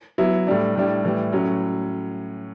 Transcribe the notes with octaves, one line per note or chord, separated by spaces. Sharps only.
F#3 B3 E4
A2 G3 D4
A2 G3 D4
A2 E3 G3
A2 F#3 C#4